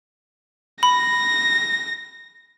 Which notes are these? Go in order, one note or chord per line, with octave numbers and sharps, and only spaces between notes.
B5 A#6